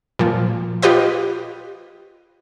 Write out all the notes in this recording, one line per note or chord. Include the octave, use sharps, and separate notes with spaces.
A#2 F3
F4 G4 B4 D#5